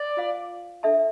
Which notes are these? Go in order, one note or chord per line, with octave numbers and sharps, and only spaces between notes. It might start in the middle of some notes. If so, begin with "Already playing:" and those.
Already playing: D5
F4 C5 F5
D4 A4 E5 A5